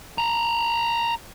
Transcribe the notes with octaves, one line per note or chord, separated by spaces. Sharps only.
A5 A#5